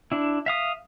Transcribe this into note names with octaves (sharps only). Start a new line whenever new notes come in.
D4 E4
E5 F5 D#6